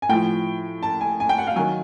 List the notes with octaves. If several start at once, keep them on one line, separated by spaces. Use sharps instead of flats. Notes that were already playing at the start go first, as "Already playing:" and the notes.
G#5
A2 F3 G5
A5
G#5
G#5
G5
F#5
F5
D#3 F#3 G#5